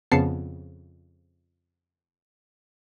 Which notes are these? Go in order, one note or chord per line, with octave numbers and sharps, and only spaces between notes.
F2 C#3 B3 A5 C7 C#7